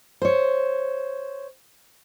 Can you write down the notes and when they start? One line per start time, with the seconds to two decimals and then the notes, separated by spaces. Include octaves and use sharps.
0.22 C5 C#5